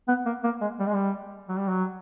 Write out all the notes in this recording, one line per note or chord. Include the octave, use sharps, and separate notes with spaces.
B3
A#3
A#3
G#3
G3
G#3
G3
F#3
G3
F#3